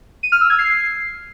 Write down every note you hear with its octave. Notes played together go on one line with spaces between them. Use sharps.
D#7
F6
E6
G#6
C7